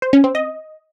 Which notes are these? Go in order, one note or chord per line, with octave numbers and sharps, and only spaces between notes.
C5
C#4
C4
D#5